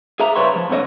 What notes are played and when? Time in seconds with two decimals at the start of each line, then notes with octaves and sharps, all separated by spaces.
0.20 G#4 E5 A#5
0.35 C#3 G3 B4 C#5 E5 C6
0.56 F3
0.69 C2 A#2 D3 C#5 D#5